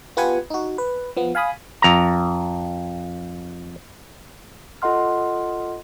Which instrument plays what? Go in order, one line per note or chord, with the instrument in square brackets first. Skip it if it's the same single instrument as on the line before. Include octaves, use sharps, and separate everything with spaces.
[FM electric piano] B3 F4 G4 B4 F#5 G#5
D#4 F#4
B4
F3 B3
F5 G#5 B5 D#6
[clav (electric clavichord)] F2 A#5
[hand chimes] F4 A4 D#5 F#5 C6 F6